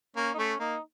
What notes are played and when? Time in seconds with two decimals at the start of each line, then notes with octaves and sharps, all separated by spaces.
0.16 A#3 C#4
0.34 D#4
0.38 A3 C#4
0.60 A#3 D#4